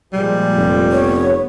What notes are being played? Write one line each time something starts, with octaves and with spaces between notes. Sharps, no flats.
A#2 F3 G3 G#3
F1
B3 C#5